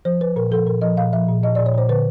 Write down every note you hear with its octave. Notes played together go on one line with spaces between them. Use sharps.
F3 C5
F3 B4
A#2 A#4
F3 A4
A#2 A#4
F3 D#5
A#2 F5
F3 E5
A#2
A#2 D#5
A#2 D5
C#5
A#2 C5
D3 B4